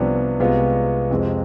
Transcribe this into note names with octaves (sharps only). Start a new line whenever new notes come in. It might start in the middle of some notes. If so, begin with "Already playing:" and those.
Already playing: C2 C3 F3 B3 D4
C2 C3 G#3 B3 F4
F2 C3 F3 G#3 C4